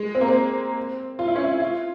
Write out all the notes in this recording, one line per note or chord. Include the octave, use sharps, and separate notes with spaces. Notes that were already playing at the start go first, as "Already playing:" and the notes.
Already playing: G#3
C4
A#3
C4
F4
E4
C#4
E4
F4